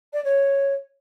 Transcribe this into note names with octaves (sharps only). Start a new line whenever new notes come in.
D5
C#5